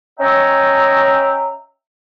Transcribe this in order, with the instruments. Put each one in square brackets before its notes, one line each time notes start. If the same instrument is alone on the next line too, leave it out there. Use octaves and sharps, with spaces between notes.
[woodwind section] C#4 C#5 D#5 E5 G5 A#5